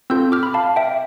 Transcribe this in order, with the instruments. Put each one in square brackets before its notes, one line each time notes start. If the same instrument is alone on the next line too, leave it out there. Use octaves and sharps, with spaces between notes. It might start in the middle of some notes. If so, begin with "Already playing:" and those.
[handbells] C4 F4 A4 E6 G6
D6 F6
B5
F5 A5
E5 G5